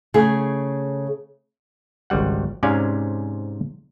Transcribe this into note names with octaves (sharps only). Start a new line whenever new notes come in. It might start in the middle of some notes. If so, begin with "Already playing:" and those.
C#3 A3 G#4
G#1 C#2 G3 F#5
G#2 C3 C#4 D5 F5 G#5